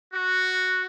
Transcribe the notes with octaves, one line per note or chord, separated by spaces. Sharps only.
F#4